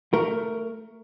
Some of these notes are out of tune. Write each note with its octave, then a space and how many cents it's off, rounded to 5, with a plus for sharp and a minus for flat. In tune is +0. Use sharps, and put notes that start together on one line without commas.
A3 +20 A#4 +0